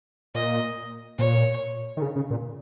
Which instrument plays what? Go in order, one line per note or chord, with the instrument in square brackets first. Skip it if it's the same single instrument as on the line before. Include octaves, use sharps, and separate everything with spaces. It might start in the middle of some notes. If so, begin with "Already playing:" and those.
[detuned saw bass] A#2 [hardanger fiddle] D#5
[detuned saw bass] A#2 [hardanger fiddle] C#5
[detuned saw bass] D#3
C#3
C#3
A#2